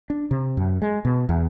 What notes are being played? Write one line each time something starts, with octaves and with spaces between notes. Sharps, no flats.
D4
C3
F#2
G#3
B2
E2